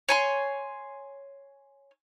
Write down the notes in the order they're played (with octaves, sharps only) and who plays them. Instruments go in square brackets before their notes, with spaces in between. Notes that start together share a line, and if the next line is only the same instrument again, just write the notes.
[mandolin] C#5 G#5 C6